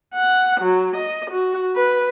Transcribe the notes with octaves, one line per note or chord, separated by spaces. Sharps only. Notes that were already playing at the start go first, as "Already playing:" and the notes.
F#5
F#3
D#5
F#4
B4